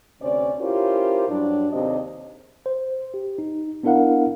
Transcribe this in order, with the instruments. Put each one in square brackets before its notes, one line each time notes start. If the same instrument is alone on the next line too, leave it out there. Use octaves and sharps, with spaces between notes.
[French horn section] D2 C3 C#4 C5 D5
C#4 E4 F4 G4 A#4 C5
G2 F#3 D4
D#2 C3 D4 G#4 C5 D#5
[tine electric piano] C5
G4
D#4
B3 D4 E4 A#4 F5 F#5